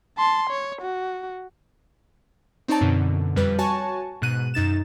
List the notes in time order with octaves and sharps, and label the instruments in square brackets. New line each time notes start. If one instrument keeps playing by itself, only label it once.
[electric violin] A5 C6
C#5
F#4
[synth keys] C4 D#4 C#5 D5 A5
F#2 B2 D3
F2 G3 B4
F#4 C#5 G#5 A5 C#6
G#2 B2 F#6 D#7
F#2 D#4 A6 E7